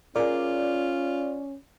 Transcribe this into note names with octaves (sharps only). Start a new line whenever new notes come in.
C#4 F4 G#4 A#4 D5